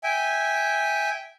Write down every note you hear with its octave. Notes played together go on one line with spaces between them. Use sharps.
E5 G5 G#5